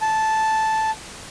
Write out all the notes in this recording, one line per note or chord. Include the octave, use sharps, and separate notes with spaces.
A5